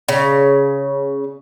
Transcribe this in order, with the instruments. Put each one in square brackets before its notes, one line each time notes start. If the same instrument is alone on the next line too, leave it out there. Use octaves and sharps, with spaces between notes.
[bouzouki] C#3